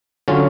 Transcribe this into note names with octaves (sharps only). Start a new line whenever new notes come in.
D3 F#3 C#4 F4